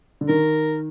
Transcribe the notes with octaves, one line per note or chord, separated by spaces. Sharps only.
D3
D#3 A#4